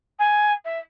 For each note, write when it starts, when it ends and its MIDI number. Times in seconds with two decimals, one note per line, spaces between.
0.19 0.53 80
0.65 0.79 76